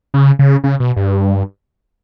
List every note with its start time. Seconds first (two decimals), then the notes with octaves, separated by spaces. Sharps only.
0.14 C#3
0.39 C#3
0.64 C#3
0.80 B2
0.96 G2